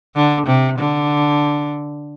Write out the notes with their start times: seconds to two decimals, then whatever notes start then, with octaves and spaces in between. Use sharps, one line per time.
0.15 D3
0.47 C3
0.79 D3